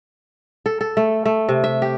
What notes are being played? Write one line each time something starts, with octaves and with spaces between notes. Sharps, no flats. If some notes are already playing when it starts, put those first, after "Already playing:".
A4
A4
A3
A3
C3
E5
G4